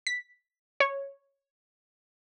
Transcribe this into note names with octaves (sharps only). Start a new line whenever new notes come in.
B6
C#5